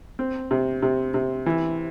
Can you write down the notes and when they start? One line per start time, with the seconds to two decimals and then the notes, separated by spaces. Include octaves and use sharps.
0.19 C4
0.51 C3
0.82 C3
1.14 C3
1.46 E3